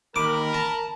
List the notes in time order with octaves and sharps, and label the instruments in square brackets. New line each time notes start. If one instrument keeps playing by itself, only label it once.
[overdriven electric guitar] D#2 [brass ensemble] A#4 [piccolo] B5 [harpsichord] D6
[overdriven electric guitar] A5 [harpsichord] A#5